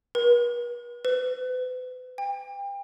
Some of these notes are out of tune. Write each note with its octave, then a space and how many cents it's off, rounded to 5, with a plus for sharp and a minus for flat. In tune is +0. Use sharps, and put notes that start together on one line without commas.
B4 -45
B4 +40
G5 +30